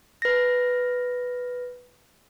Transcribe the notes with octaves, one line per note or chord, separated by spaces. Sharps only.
B4 A#6